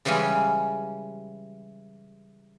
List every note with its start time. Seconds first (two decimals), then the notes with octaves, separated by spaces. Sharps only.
0.05 C#3 E3 G3 G#3 C#4